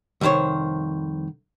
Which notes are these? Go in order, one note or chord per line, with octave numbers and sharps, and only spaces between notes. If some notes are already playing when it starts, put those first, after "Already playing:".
C2 F2 D#3 C5 C#5